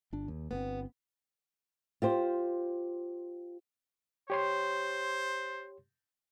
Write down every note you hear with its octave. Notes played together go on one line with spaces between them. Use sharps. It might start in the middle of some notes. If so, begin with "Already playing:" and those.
G1 D4
D#2
G1 B3 C4
F4 G4 C5
G4 C5 C#5 C6